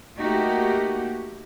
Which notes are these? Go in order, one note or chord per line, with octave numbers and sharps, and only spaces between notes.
A3 A#3 D#4 F#4 G4